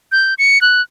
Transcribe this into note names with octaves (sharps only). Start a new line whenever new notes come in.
G6
C#7
F#6